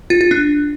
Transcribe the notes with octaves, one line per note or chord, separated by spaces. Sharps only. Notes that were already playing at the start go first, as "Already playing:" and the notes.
F4
F4
D4